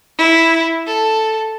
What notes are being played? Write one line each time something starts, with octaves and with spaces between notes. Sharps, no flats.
E4
A4